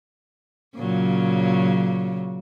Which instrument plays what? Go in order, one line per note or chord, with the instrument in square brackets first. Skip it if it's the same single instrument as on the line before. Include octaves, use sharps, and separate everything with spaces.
[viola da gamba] A#2 C#3 F#3